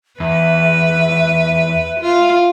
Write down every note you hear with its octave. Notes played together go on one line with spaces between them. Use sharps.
E2 B4 E5
F4